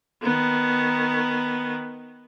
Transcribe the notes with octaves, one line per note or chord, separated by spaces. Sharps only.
D#3 B3